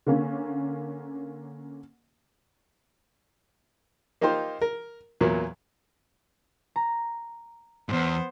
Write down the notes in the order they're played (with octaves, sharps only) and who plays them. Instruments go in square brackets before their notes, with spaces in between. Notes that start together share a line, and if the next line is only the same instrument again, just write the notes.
[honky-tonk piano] D3 A#3 C#4
[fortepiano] A#3 D#4 F4 G4 C5
A#4
E2 A#2 F#3 A#3
[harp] A#5
[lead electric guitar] E2 G#2 [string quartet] B3 C5